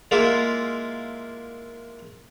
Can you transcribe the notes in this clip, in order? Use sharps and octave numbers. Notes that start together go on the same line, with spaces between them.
G#3 A#3 E4 F4